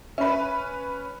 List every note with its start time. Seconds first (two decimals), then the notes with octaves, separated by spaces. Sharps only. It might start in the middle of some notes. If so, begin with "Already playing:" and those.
0.18 C#4 B4 E5 B5